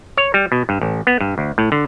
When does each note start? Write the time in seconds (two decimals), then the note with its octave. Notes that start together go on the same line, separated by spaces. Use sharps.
0.17 C#5
0.34 G3
0.52 B2
0.69 G2
0.81 A1
1.07 B3
1.21 G2
1.38 D2
1.58 A2
1.72 D3